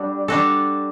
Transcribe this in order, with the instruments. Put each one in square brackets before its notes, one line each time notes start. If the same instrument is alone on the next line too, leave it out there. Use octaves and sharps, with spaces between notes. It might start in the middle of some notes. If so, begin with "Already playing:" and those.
Already playing: [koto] G3 D4 F#4 A4
G3 D4 F#4 A4